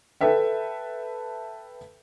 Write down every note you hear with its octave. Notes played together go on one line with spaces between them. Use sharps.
A4 B4 E5 G5